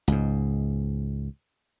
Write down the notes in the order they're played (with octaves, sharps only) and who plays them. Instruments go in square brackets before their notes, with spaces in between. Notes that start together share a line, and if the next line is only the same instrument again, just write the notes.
[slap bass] C#2 G#2